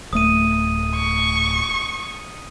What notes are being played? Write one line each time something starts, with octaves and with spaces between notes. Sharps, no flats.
D1 A3 D#6 D#7
C#6